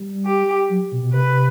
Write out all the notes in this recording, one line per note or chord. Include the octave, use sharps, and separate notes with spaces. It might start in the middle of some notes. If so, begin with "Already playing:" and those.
Already playing: G3
G4
F#3
B2
B2
C3 B4